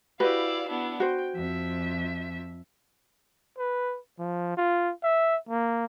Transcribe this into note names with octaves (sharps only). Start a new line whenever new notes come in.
E4 F#4 G4 B4 D5 F5
B3 D4 E4
F#4 C5 G5
F2 E5
B4
F3
F4
E5
A#3